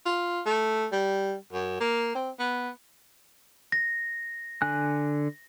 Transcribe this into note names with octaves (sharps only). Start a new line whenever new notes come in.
F4
A3
G3
F#2
A#3
C4
B3
A#6
D3 G#5 F#6